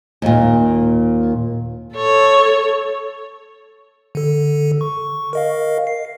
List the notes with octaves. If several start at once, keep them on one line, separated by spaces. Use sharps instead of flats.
D#2 A#2
A4 C#5
D3 A4
C#6
A#4 D#5 F5
C7